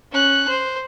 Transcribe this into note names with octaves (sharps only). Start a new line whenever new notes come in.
C#4 F#6
C5